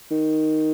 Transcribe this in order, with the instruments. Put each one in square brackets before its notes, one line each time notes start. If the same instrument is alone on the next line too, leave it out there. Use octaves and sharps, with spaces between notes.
[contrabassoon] D#3